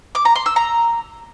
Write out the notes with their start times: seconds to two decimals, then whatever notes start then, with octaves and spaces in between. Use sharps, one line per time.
0.15 D6
0.25 A#5
0.35 C6
0.46 E6
0.56 A#5